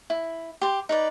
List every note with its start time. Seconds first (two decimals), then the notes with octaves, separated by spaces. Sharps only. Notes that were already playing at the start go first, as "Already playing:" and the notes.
0.10 E4
0.61 G4 C6
0.89 D#4 B4 D5